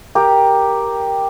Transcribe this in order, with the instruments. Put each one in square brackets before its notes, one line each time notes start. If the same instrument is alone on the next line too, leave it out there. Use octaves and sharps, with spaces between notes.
[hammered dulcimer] G4 A#4